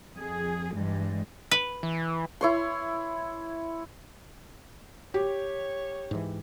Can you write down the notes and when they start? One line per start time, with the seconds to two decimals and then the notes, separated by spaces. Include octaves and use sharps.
0.15 F2 G#4
0.73 G2 E3 G3 G#3
1.51 B4
1.83 E3
2.41 E4 C#5 C6
5.14 G4 C#5
6.11 G#2 E3